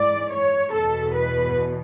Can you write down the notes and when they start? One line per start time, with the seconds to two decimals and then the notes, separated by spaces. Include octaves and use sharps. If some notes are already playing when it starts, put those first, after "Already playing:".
Already playing: G#2 E3 D5
0.31 C#5
0.72 E2 B2 A4
1.14 B4